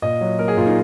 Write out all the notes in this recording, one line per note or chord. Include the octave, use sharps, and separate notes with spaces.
A#2 D#5
F#3
A#3 A#4
G#4
A#2 F4
D#4